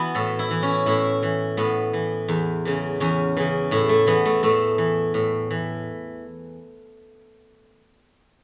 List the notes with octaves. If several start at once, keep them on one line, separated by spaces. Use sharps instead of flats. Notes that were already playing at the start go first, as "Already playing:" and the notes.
Already playing: E3 B3 E4 F#4
A2 A4
E4
E3
C#4
A2 E4
E3
A2 B3
E3
E2
C#3 E3
E2 C#4
C#3 E3
A2 E4
A3
E3 B3
A3
A2 A3
E3
A2
E3